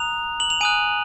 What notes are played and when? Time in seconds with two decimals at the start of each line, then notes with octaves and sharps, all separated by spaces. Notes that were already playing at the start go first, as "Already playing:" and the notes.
Already playing: A#5 D#6 F#6 F7
0.40 F#7
0.50 F7
0.61 G#5 D#6 F#6 D#7